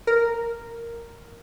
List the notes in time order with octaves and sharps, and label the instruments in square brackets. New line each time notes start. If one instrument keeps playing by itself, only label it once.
[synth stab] A#4